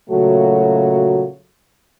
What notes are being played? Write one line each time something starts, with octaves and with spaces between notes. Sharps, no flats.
A#2 C#3 F#3 A3 F#4 A4